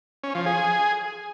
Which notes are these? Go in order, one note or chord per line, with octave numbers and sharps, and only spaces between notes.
C#4
F3
G#4